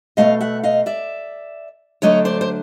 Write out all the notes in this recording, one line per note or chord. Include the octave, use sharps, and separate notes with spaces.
B2 F#3 A3 D#5 F5
E5 F#5
D#5 F5
D5 E5
D3 F#3 A3 D4 C#5 D#5
C5 D5
C5